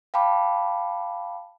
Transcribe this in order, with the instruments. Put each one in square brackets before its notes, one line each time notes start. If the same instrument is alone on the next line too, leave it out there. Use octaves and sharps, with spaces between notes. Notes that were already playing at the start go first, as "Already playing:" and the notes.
[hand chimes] F5 G5 A5 B5 D6